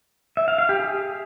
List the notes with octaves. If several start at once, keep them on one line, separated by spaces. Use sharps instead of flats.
E5
F5
F5
G4
G#4